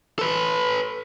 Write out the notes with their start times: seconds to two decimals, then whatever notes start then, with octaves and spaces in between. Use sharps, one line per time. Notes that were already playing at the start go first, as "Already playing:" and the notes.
0.19 A4 B4